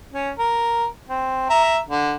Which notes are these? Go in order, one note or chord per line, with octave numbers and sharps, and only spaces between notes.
C#4
A#4
C4
E5 A#5
D3